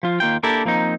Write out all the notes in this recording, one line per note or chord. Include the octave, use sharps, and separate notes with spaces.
F3 F4
D#2 A#3 F4 G5
A#3 D4 E4 G4 A4 A#4
F3 A#3 C4 D#4